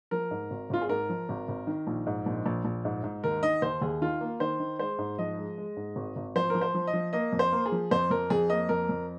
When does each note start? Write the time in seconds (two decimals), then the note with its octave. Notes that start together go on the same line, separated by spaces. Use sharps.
0.11 F3 A#4
0.31 G#2
0.51 G#1
0.70 G#1 F4
0.82 G#4
0.89 G#2 A#4
1.09 F3
1.29 G#1
1.48 G#1
1.67 D#3
1.87 A#1
2.07 G#2
2.26 A#1
2.46 A#1
2.65 A#1
2.85 G#2
3.04 G#2
3.24 D#2 A#4
3.43 D#3 D#5
3.62 D#2 C5
3.82 D#2 G#4
4.01 D#3 F4
4.21 A#3
4.40 D#3 C5
4.60 D#3
4.79 G#3 C5
4.99 G#2
5.18 F3 D#5
5.38 G#3
5.58 G#3
5.77 G#2
5.96 G#1
6.16 G#1
6.35 F3 C5
6.50 F3 A#4
6.61 C5
6.74 F3
6.87 D#5
6.93 F3
7.13 A#3 D#5
7.33 F2
7.39 C5
7.52 A#3
7.66 G#4
7.72 F3
7.91 F2 C5
8.11 F2 A#4
8.30 F2 G#4
8.50 A#3 D#5
8.69 F2 A#4
8.89 F2